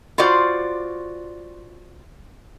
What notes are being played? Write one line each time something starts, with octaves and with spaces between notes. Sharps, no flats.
F4 F#4 C5 D5